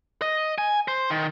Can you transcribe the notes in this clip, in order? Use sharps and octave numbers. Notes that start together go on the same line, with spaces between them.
D#5
G#5
C5
D#3